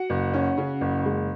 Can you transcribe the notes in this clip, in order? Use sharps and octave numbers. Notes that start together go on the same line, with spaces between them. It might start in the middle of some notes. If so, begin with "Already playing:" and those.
Already playing: F#4 F#5
F#1
C#4
C#3
F#1
G#3